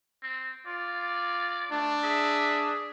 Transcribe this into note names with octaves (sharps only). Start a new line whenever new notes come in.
C4
F4 D5
A3 D4
G#4 E5